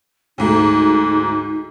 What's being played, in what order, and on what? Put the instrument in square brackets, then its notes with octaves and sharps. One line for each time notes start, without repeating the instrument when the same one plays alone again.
[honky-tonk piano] D2 G#2 A3 [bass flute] D#4